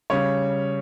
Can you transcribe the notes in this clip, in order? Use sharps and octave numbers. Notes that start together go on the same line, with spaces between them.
C#3 G3 C#5